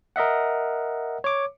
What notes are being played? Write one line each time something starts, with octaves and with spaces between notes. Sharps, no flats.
A#4 D#5 E5 F#5
C#5 D6